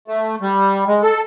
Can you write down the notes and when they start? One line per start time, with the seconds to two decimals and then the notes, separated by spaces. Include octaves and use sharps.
0.08 A3
0.42 G3
0.87 G#3
1.03 A4